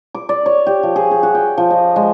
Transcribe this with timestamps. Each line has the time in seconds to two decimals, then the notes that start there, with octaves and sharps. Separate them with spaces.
0.15 D6
0.29 D5
0.46 C#5
0.67 G4
0.83 F3
0.96 G#4
1.11 G#4
1.23 F#4
1.35 G5
1.58 F3
1.71 D#5
1.96 G#3